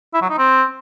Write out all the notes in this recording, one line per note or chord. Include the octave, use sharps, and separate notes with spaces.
E4
F#3
D#4
C4